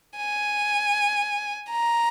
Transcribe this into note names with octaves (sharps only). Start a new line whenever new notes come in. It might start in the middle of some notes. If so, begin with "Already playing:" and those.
G#5
A#5